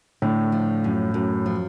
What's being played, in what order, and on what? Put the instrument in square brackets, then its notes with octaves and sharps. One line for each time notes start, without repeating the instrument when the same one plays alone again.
[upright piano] A2 [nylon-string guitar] D3
[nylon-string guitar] F3
F#2
F#2
F3